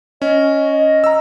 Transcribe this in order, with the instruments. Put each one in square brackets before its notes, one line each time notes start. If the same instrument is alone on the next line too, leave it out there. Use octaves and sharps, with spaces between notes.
[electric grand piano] C#4 [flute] D#5
[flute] D#5
[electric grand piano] A#5 E6